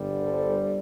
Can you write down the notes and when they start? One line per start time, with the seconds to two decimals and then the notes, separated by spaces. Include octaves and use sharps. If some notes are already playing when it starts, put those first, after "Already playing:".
Already playing: G1 G2 D3 G3
0.22 A4 C5